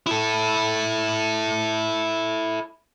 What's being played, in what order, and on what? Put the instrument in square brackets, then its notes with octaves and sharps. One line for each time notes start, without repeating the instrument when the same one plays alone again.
[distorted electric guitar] E4 A4